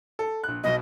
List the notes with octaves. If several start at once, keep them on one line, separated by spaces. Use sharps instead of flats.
A4
A#1 F#6
B1 B2 D#5